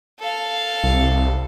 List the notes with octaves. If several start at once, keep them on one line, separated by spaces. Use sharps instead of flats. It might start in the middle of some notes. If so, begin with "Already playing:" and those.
A4 F5
C2